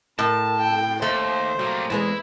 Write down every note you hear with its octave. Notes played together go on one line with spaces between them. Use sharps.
A2 A#4 A5
G5
D#2 A3 C5
F#3 G3 A#3
E2 G#3 B3 E4